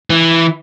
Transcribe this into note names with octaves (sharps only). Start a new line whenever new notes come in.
E3